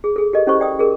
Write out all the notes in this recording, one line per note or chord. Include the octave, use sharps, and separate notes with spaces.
G#4
G#4 A4
G4 A4 A#4 D#5
C#4 E4 G4 A4 C5 C#6
D5 G5 D#6
G#4 A#4